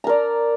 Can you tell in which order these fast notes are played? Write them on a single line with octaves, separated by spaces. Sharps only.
A#5 A#4 D5